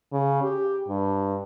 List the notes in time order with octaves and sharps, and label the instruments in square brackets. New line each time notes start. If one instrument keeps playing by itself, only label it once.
[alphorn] C#3
G4
G2